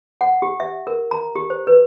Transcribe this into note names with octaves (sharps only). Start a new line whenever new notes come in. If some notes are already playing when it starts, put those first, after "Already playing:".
F#5
G4
E5
A#4
A#5
G4
C5
B4